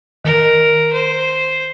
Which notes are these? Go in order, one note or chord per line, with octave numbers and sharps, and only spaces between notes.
D#3 A#4
C5